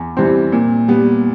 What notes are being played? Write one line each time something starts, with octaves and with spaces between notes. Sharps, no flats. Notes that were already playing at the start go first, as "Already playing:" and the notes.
Already playing: E2
C3 E3 G3 C4
A#2
G3 B3